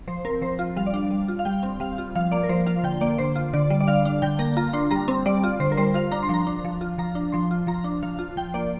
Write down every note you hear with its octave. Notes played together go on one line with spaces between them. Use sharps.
F3 C5
C4 A#4
F3 C5
F4
G3 F5
D5
D4 F5
G3
F4
F5
G3 G5
C4
G3 F5
F4
F3 F5
A#3 D5
A#4
F3 C5
F4 F5
D3 G5
A#3 D5
D3 C5
F4
D3 D5
G3
D5
D3 F5
D4
D3 G5
A#3 A#5
F4 A#5
D4 C6
G3 A#5
C4
G3 D5
F4
D3 C5
A#4
G3 C5
F4 F5
D4 A#5
C6
F3 A#5
D4
F3
F4
F3 A#5
D4
F3 C6
F4
F3 A#5
D4
F3 F5
F4
F3 G5
A#3 D5